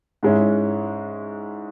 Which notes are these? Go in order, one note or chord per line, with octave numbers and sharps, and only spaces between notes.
G#2 G#3 C#4 E4